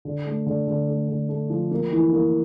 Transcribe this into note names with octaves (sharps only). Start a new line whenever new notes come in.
D3
A3
D3
D3
A3
D3
A3
F3
A#3
E3
A#3